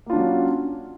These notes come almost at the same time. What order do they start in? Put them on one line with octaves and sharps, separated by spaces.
A#3 F4 D4 F#3 C#4